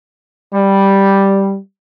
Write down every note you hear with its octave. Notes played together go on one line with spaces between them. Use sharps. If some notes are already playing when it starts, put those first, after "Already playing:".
G3